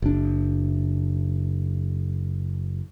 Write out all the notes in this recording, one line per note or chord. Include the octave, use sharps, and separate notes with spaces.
F#1 D4